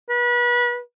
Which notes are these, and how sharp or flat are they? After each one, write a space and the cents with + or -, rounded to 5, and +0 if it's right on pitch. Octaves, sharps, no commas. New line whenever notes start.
B4 -30